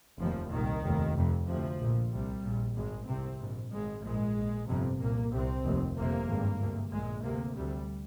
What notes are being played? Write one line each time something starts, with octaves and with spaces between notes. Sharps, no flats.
F1 D#2 F3
C2 A#2 D#3
F1 D#2
F1 F2 C3
D2 C3 F3
A#1 A#2
C2 C3 G3
A#1 A#2
G#1 G#2 G#3
C2 C3 C4
A#1 G#2
G#1 G#2 G#3
A#1 G#2 G#3
A#1 G#2
G1 F2 C3
C2 A#2 A#3
C2 C3 C4
F1 D#2
G1 F2 C3 A#3
G#1 G2
D2 C3
A#1 A#2 G#3
D2 C3 A#3
D2 C3 G3